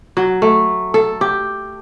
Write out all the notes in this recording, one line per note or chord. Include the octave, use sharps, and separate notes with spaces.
F#3
A3
A4
G4